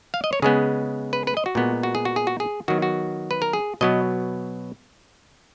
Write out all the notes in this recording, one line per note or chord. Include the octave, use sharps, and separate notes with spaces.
F5
D#5
C#5
C#3 G#3 B3 G#4
B4
B4
D#5
F#4
A#2 G#3 B3
F#4
G#4
F#4
G#4
F#4
G#4
D#3 F#3 B3 F#4
F#4
B4
A#4
G#4
B2 F#3 B3 D#5